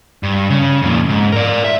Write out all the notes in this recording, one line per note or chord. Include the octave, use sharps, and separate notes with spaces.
G2
C#3
F2 A#2
G#2
A#4 D5
E5